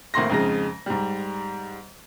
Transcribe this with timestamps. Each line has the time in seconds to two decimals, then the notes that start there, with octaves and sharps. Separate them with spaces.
0.14 G#1 A2 A#3 C6 A#6
0.30 F2 G#2 C#3 G#3 A#6
0.86 G#2 G3